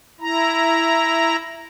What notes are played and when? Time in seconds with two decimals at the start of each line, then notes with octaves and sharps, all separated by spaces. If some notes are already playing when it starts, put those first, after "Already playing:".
0.20 E4 A#5